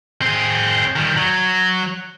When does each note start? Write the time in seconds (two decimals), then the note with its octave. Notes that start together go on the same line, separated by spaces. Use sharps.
0.22 C4 G#4
0.96 D#3 G3
1.16 F#3